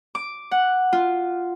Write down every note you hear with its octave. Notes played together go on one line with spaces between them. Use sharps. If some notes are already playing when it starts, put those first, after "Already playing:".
D6
F#5
F4